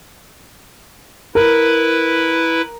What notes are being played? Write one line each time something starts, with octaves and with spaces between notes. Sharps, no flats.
E4 A#4 B4